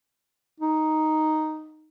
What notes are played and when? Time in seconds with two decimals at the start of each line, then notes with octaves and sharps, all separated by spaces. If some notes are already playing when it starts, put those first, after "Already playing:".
0.60 D#4